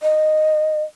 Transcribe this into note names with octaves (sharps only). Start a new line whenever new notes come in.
D#5